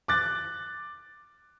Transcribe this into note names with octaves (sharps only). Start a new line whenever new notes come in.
D6 F#6 A6